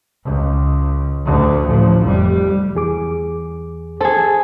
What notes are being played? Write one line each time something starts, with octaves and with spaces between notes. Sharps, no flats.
C#2
D2 D3
A1 F3
F1 G3
E2 G#4 D6
G#4 A4 C5